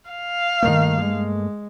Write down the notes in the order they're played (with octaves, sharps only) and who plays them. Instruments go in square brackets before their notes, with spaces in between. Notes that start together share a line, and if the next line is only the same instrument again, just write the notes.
[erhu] F5
[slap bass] G2 A3 A#3 [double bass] D#3
[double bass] G#3